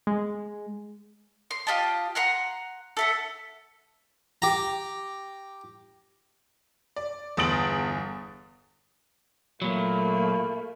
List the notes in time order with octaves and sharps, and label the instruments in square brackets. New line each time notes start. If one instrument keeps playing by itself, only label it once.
[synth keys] G#3
[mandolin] C6
F4 G4 D#5 A5
F#5 A#5 C6 F#6
A4 E5 F#5
[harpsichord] G4 A#5
[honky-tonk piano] D5
G1 E2 D#6 A6 D7 F#7
[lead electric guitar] A#2 F#3 [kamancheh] A3 A#3 [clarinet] B5